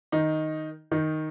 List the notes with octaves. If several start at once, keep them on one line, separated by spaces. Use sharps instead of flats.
D#3 D#4
D#3 D#4